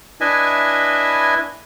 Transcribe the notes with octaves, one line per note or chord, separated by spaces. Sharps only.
D4 E4 B4 D#5 E5 G#5